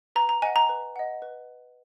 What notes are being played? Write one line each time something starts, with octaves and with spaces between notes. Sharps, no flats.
B4 A#5
A#5
D#5 F#5 G#5
A#5
B4
D#5 F#5
B4